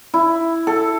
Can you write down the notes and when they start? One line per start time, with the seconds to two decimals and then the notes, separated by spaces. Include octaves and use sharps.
0.14 E4
0.67 A4